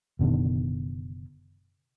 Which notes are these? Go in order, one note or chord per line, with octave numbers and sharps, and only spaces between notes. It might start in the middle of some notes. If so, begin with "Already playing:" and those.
F#1 B2 D3 D#3